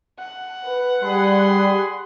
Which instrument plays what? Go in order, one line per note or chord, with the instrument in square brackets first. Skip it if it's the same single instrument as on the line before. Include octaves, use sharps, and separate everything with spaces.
[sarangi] F#5
[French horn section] B4
[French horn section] G3 [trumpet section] G#4 B5 C6